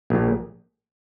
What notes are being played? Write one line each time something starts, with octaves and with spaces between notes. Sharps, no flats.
A#1